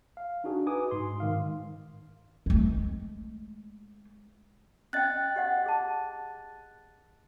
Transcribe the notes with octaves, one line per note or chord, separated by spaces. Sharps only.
F5
D4 D#4 F#4 G#4
D#4 F#4 B4 G#5 D6 D#6
G#2 C6
G#2 D#3 F5
G#3 A3
C#4 D#5 G5 F#6 A6
G4 D#5 F#5
G#4 A5